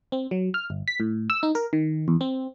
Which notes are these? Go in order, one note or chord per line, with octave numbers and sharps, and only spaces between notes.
C4
F#3
F6
G1
B6
A2
E6
D#4
A#4
D#3
E2
C4